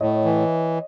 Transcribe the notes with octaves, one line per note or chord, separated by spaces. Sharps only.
A2 C#5 D#5
E3